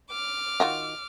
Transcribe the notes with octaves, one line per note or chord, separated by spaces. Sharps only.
D6 F6
D#3 F4 F#4